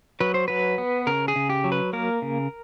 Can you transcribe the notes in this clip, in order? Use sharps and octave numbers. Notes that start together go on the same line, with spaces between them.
F#3 B4
C5
F#3 B4
B3
C#3 A#4
G#4
C#3
G4
F#3
B4
A#3 A#4
C#3